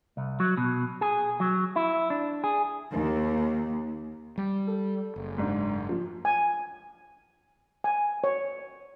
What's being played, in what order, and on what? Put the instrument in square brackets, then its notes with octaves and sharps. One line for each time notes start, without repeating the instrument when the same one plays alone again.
[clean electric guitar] C2
F#3
B2
G#4
F#3
E4
D4
G#4
[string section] D#2
[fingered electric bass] G3
[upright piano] A4
[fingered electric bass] F#1
[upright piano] G#2 D4
F3
[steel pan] G#5
G#5
C#5